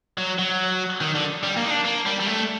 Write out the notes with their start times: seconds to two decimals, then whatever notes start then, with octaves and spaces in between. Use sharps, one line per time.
0.18 F#3
0.39 F#3
1.01 D#3
1.15 D3
1.43 G3
1.57 A#3
1.65 D#4
1.71 D4
1.85 A#3
2.06 G3
2.20 G3
2.27 A3